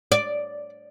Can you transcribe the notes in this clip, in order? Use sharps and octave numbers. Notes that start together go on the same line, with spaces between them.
D5